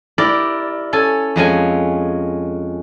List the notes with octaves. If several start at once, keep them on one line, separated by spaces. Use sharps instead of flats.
E4 G4 A#4 D5
C#4 A4 G#5
F2 G#3 C#4 G#5